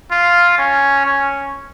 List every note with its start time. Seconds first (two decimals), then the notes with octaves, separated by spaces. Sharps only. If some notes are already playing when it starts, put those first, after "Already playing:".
0.11 F4
0.58 C#4
1.06 C#4